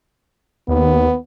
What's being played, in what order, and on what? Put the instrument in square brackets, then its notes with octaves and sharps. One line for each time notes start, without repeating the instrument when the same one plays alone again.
[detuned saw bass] D#2 [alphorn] B3